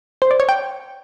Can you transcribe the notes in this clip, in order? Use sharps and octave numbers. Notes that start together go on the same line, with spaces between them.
C5
D5
C#5
G5